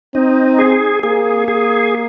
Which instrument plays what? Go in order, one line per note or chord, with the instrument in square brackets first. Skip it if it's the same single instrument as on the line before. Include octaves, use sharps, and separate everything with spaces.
[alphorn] C4 [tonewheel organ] D#4
[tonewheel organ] G#4
[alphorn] A#3 [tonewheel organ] G#4
[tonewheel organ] G#4